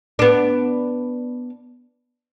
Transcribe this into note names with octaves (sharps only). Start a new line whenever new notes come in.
B3 D4